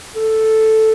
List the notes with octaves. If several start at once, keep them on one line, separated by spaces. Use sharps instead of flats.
A4